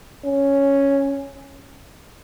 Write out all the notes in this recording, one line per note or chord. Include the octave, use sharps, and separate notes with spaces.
C#4